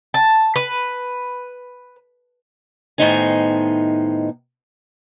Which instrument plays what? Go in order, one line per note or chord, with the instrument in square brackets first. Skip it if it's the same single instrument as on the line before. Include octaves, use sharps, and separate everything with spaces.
[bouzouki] A5
B4
[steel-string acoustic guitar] A2 D#3 B3 D#4 C5 G#5